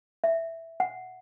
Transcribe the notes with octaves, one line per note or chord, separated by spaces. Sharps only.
E5
F#5